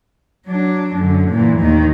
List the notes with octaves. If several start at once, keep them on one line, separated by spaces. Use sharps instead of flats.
F#3 D4
F#2 D3
A#2 E3
D#2 D#3